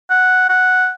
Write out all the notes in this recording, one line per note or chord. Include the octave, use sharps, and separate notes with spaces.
F#5
F#5